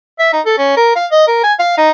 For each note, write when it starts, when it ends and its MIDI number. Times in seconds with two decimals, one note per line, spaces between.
0.20 0.32 76
0.33 0.41 63
0.46 0.56 69
0.58 0.75 61
0.77 0.91 70
0.96 1.06 77
1.11 1.28 75
1.28 1.41 70
1.43 1.53 80
1.59 1.76 77
1.78 1.91 63